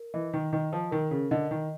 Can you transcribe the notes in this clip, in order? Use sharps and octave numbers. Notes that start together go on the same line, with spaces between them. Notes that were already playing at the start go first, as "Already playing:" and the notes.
Already playing: A#4
E3 D#5
D#3
D#3 D#5
F3
D#3 A#4
C#3
D3 D#5
D#3